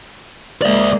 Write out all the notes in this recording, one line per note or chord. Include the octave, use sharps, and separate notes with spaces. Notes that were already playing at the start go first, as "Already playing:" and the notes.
G#3 A#3 D5 E5